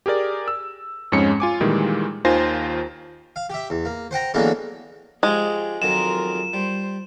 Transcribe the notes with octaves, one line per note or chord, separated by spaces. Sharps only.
G4 G#4 A#4 D5
E6
F2 G#2 G#3 C#4 C#7
F4 G#5 D6
A#2 D#3 E3 G3 G#3
D#2 D#3 F4 C5 G#5 A#6
F5
G4 E5
E2
A#3
C5 F#5 G5 A#5
F#2 D3 E3 G#3 A#3 B3
F3 G#3 G4 G#4 A#5
F2 D#3 F#3 F4 A#4 E7
G3 C5